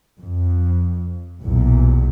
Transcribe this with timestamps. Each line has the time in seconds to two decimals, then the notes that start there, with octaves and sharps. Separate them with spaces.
0.20 F2
1.43 B1 E2 A#2